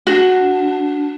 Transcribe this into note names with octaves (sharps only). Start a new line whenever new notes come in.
D4 F#4